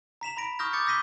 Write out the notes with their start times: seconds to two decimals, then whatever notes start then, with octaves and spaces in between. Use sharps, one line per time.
0.21 A#5 B6 E7 F7
0.37 A#5 B5 A#6 D7
0.59 C#6 D#6 F6 G6 A#6
0.73 D6 G6 A6 C#7
0.86 E6 G6 A#6 B6 D#7 G7